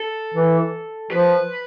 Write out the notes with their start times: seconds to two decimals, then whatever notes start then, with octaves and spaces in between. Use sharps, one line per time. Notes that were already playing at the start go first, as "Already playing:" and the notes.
Already playing: A4
0.35 E3
1.11 F3 B4